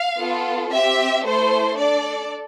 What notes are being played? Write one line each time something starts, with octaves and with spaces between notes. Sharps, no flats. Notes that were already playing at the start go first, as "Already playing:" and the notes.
Already playing: F5
B3 F4 A4
C4 G4 E5
A3 E4 A4 C5
D4 A4 D5